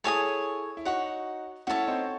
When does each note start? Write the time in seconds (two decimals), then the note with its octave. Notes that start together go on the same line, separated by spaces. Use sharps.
0.04 E4 G#4 A4 C#5 G#5 D#6
0.77 E4
0.85 D#4 F#4 C#5 F#5 C#6
1.67 C#4 E4 F#4 A4 C#5
1.87 C4 D#4